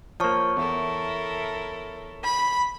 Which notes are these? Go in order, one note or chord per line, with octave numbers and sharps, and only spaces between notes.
F3 A#3 C#5 A5 C#6
E2 E4 A4 A#4
B5